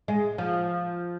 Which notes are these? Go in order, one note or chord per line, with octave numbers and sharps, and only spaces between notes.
G#3
F3